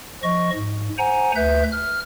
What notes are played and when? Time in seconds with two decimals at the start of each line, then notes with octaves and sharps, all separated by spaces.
0.23 F3 D#5 C#6
0.55 G#2
0.98 C5 F#5 G#5 A#5
1.36 D2 B4 E5 G6
1.72 F6